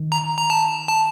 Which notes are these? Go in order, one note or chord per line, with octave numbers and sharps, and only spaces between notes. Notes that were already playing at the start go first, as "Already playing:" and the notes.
Already playing: D#3
A#5
A#5
A5
A5